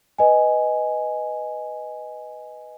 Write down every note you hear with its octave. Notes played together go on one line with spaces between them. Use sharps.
B4 D#5 G#5